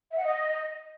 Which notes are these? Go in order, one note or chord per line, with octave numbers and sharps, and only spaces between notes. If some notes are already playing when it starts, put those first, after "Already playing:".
E5
F#5
D#5